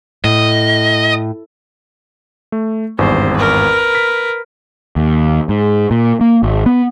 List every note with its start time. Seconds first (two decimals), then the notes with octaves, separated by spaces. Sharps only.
0.24 A2 D#5
2.52 A3
2.99 G#1 E2 G2 C5
3.37 A#4 B4
3.95 B6
4.96 D#2
5.49 G#2
5.91 A#2
6.21 A#3
6.43 G#1
6.66 B3